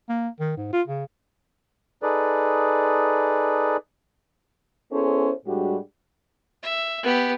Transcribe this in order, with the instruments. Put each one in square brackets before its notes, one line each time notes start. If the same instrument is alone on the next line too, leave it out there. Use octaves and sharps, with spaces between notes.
[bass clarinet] A#3
D#3
G#2
F4
C#3
[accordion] D#4 G#4 A4 B4 D5
[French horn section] B3 C#4 E4 G#4 A4 C5
A2 G3 G#3 D4 F#4 G4
[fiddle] E5
B3 G4